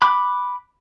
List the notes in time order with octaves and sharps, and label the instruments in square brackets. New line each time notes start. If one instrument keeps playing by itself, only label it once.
[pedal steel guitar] B5 D6 F#6